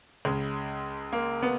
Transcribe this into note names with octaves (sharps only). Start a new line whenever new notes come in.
C#2 C#3 G#3
A#3
B3